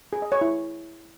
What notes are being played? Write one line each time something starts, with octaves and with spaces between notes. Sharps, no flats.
G#4
D#5
C#5
E4